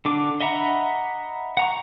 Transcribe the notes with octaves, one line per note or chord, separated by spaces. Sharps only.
D3 D4 D6
D#5 E5 F#5 A#5 B5
F#5 A#5 C#6